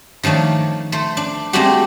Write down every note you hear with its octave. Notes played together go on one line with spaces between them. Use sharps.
D#3 F3 A3 D4 C#5
A3 C5
D4
G#3 A3 C4 D4 F#4 G4